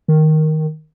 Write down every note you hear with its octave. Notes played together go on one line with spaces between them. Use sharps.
D#3